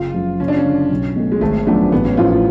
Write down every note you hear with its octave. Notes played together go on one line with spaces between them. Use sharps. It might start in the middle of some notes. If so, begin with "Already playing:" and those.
Already playing: F#1 F4
F#2 C#3 F3
F#1 C#4
D4
C#4
F#2 D3
B1
B2 A3
G#3
G#1 A3
F#2 F3 A3 B3 D4
A1 B3
C#4
A2 F3 F4
F4